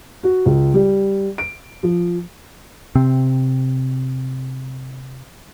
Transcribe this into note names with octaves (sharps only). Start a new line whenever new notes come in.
F#4
C#2
G3
D7
F3
C3 C4